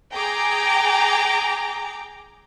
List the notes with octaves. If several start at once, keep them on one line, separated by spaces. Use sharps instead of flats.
G#4 G5 A#5 D6